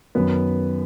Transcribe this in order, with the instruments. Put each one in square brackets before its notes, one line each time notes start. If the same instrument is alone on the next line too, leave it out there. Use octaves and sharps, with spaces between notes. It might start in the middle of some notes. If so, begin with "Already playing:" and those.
[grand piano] F#2 D#3 F#3 B3 B4